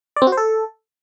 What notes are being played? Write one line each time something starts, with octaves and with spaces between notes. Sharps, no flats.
D5
C4
F#4
C5
A4